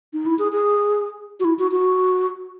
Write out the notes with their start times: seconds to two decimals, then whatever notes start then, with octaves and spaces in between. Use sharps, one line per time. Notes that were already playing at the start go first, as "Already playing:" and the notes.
0.13 D#4
0.26 E4
0.39 G#4
0.53 G#4
1.40 F#4
1.45 E4
1.59 F#4
1.71 F#4